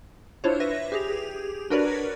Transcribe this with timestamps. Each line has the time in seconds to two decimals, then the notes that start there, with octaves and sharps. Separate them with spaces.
0.44 D4 E4 F4 C5 C#5
0.60 B4 E5 A#6
0.92 G4 G#4 F7
1.70 D4 F#4 A#4 B4 C#5 D5